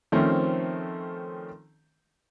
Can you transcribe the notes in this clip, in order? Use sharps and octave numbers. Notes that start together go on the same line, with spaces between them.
D#3 F3 A3 C4 C#4